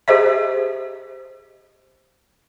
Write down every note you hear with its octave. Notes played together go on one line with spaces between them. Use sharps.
G4 G#4 C5 D#5 E5